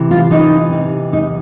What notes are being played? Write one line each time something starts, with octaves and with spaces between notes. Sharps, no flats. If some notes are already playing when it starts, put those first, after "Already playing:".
Already playing: C3 E3
F4
E3 D#4
C3
E2 D#4